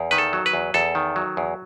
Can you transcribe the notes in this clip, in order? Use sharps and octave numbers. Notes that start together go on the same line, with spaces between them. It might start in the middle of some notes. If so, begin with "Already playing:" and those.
Already playing: E2
D#3 B4
A4
F#3
B4
E2
E2 A4
D#3
F#3
E2